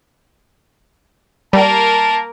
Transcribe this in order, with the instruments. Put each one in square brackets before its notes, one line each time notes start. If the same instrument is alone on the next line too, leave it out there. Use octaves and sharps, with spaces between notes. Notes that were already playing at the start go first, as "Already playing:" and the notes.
[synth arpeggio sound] G3 [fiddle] A#3 A#4 [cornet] A5